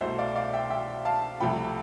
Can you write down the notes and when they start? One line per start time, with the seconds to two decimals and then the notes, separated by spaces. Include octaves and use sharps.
0.01 C2 B2 A3 C5 E5
0.18 D5 F5
0.36 D5 F5
0.53 E5 G5
0.70 E5 G5
1.05 F5 A5
1.40 C2 C3 F3 A3 G5 B5